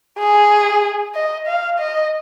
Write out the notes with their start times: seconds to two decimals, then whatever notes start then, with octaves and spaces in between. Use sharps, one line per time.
0.19 G#4
1.15 D#5
1.47 F5
1.79 D#5